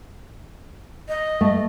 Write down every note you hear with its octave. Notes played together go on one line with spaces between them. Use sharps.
D#5
A3